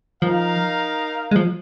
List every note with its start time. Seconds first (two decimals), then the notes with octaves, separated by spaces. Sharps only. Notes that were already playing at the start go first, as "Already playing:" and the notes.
0.22 F3 D#4 A#4 F5
1.31 G#3
1.36 F3